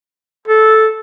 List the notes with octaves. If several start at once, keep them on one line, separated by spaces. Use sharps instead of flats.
A4